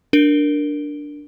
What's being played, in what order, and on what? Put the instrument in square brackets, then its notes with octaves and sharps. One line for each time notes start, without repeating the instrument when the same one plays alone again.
[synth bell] D4 A#4 D7 G7